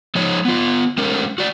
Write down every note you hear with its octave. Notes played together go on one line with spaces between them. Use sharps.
F3 G#3 D#4 C#5
B3 F4
G#3 A3 C#4 A#4
F#4 D5